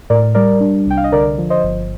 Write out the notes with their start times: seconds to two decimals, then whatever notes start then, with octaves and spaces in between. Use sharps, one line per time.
0.10 A2 A#4 D5
0.35 G3 A#4 D5
0.61 D4
0.86 C2 G5
0.97 F5
1.04 D#5
1.12 D3 A#4 D5
1.38 F3
1.50 C5 D#5
1.64 G1